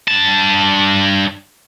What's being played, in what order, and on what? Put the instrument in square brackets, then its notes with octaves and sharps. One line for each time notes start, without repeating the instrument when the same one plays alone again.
[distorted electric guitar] G2 A5